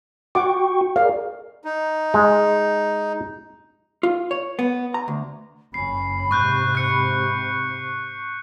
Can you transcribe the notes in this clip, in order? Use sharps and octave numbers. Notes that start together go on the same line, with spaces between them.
F#4 F#5 G5 C#6 D6
G#4 A#4 D5 F5
D#4
G#3
F4
C#5
B3
A#5
D2
F#1 C#4 B5 C7
G#2 C3 C#6 F#6 G6
F#6 C#7